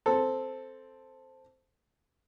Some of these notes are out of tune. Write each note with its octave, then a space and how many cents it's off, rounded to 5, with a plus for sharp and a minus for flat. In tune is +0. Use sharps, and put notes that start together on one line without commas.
C4 +0 A4 +0